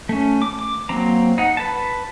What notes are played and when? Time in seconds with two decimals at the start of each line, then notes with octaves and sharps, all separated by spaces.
0.09 A3 C#4
0.42 D6
0.59 D6
0.89 F#3 A#3 C4 A#5
1.38 D#4 F#5
1.57 B4 A5